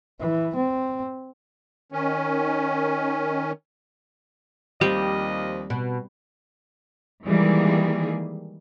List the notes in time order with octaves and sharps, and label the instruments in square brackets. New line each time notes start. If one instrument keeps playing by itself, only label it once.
[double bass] E3
C4
[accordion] D#3 C#4
[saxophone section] D#2 F3 D#5 [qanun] G3 [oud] C4
[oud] B2
[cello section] D#3 E3 G3 G#3 A#3 G#4